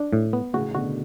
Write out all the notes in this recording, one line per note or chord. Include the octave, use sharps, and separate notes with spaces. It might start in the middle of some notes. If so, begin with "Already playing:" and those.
Already playing: D4
A2
B3
A2 C#3 F#4
B2 D3 F#4